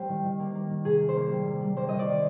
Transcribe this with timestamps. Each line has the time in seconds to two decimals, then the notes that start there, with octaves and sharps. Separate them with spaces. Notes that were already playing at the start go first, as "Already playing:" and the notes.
Already playing: G3 A#3 G4 C5
0.09 D#3
0.24 D#3
0.40 A#3
0.54 A#3
0.70 D#3
0.85 C3 G#4
1.01 A#3
1.09 C5
1.16 A#3
1.31 G3
1.46 C3
1.61 G3
1.77 A#3 C5
1.89 D#3 D#5
1.99 D5
2.07 A#3